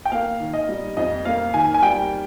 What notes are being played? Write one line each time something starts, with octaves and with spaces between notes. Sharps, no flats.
G5
A#3 F5
D#3
D#5
G3
F2 D#5
A#3 F5
D#3 G#5
G#5
G3 G5